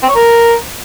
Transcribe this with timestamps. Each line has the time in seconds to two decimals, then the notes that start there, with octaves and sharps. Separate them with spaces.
0.03 C4
0.09 C#5
0.15 A#4